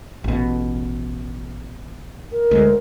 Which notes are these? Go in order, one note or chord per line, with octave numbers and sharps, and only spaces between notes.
A1 B2
A#4
D2 G#3